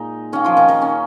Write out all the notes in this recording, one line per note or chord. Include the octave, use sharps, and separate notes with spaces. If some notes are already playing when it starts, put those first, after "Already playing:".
Already playing: A#2 G#3 D#4
D#3 A#3 C#4
F3 F4
D#3 D#4
D#3 D#4
C#4